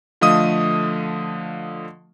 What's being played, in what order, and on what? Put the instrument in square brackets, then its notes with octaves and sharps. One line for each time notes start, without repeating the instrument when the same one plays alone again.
[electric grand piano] D3 F3 A3 D#5 F5 D#6